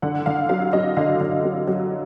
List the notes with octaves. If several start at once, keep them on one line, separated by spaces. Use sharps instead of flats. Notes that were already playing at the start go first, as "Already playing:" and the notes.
D3 F#5
D3 F5
F#3 F5
F#3 D#5
D3 F5
D3
F#3
F#3